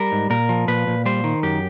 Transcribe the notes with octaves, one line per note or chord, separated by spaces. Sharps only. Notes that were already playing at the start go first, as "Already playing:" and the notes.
Already playing: G3 A#4
G#2
A#2 A#4
F3
A#2 B4
A#2
G3 C5
D#3
F#2 G4